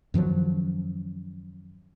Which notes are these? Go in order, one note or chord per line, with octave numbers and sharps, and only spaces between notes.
F#2 D#3 F3 F#3